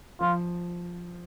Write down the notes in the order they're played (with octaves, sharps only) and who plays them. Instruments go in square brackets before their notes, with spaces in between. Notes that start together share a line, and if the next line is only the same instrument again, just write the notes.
[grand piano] F3 [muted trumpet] F4